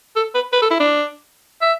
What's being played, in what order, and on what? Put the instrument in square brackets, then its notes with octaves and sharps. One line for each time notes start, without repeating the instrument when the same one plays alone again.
[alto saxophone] A4
B4
B4
A4
E4
D4
E5